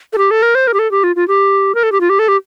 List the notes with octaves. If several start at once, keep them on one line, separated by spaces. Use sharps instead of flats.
A4
G4
A4
A#4
C5
A#4
G4
A4
G4
F4
F4
G4
A#4
A4
G4
F4
G4
A4
G4